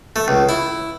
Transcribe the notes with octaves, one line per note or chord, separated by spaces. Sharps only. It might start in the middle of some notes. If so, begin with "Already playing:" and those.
A3
C#2
E4